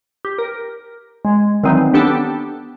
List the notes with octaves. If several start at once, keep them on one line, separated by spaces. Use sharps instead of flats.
G4
A#4
G#3
D#3 E3 F#3 G3 C4 D#4
B3 D4 G4 A4 G5 A5